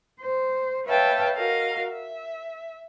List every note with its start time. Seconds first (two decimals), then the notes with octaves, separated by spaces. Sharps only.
0.19 C5
0.86 B4 C#5 E5 F5 G5 A5
1.36 F#4 A#4 D#5 F5
1.89 E5